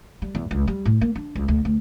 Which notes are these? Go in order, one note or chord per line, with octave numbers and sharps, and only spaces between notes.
G3
E2
C#2
G3
A2
A#3
D4
C#2
D2
D2